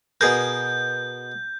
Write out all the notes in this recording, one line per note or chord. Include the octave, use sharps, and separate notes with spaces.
B2 G#4 A#4 G6